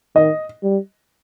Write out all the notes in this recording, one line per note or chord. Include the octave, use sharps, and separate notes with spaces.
D#3 D#5
G3